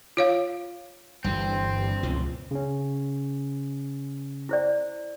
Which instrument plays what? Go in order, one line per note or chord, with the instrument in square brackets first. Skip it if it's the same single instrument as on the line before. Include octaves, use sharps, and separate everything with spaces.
[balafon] F4 C#5 F5
[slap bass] G1 D3 E3 [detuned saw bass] G2 [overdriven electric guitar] C4
[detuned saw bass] C#2 [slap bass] B2 E3 F3
[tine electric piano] C#3 C#4
[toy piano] E4 C5 D5